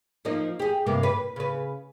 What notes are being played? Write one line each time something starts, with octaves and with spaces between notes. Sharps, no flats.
F3 A#3 D#4
G4 G#4
G2 C3 A#3
B4
C#3 B4